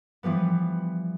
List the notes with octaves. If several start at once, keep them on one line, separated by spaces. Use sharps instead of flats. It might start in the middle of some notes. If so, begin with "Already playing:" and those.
E3 F3 G3 B3